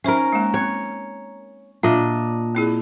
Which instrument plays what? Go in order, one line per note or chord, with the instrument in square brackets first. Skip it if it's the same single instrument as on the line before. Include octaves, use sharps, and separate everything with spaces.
[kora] C#4 A#4 [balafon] D#4 C5 E5
[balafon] G#3 A#3
[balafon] C4 [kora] C#5
[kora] A#2 D4 D#5 [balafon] E5
[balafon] C4 E4 G#4